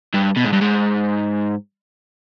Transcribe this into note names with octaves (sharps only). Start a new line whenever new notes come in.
G2
B2
G#2
G2
G#2